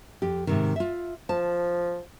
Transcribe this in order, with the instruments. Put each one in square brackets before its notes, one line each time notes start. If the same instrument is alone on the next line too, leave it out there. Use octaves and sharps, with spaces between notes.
[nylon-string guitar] F2 G4
G#2 C3 D#3
F4 E5
[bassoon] F3 [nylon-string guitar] A5